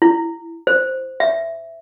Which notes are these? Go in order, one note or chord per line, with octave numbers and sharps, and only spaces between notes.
E4
C5
E5